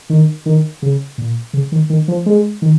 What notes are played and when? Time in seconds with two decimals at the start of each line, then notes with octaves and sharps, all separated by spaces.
0.10 D#3
0.46 D#3
0.82 C#3
1.18 A#2
1.53 C#3
1.72 D#3
1.90 D#3
2.08 F3
2.26 G#3
2.62 D#3